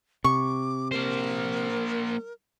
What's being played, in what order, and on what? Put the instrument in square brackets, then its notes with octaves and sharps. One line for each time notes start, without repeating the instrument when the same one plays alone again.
[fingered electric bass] C3 [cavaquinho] C#6 [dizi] D6
[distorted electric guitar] A#3 C5 [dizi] A#4